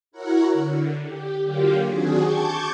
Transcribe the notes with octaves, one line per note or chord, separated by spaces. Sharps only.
E4 F#4 A#4 C#5 F#5
D3
G4
D3 F#3 A#3 F4 G4
D#3 C4 D4 F#4 G#4
A5 C#6 D6 G6 G#6